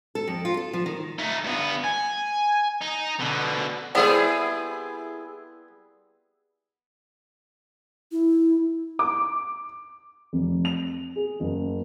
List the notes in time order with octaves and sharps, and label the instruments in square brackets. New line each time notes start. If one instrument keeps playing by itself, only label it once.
[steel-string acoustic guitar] A4
F2
F4
A4
F3
D#3
[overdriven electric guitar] A3 D#4
G2 B3
G#5
D#4
B2 D3
[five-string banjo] G3 B3 C4 [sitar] E4 G#4 A4
[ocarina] E4
[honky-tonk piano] D6
[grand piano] F1
F7
G#4
F#1